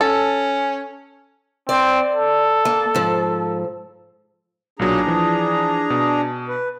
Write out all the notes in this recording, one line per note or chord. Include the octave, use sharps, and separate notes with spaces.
C#4 A4
C4 D5
A4
A#3
G#2 F3
B1 A#2 F#3 D4 G#4 A#5
E3 F3
B2
B4